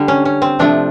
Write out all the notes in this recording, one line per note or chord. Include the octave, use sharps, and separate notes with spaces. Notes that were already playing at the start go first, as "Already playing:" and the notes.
Already playing: D3 G3
C#4
C#4
C4
C3 F3 A3 D4